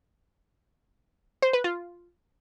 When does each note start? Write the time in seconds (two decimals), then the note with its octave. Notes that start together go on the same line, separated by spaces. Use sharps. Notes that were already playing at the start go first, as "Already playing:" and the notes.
1.42 C5
1.53 B4
1.64 F4